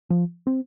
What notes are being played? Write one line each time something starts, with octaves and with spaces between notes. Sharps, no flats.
F3
C4